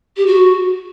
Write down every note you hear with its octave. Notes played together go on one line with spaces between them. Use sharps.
G4
F#4